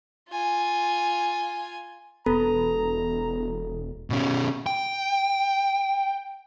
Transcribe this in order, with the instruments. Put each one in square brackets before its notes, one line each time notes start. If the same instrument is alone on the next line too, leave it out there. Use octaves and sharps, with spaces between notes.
[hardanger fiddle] F4 G#5
[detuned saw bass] E1 [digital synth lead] B3 [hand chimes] A4 [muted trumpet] A#5
[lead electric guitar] B2 C#4
G5